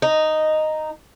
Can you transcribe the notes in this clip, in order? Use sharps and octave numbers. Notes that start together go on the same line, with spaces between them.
D#4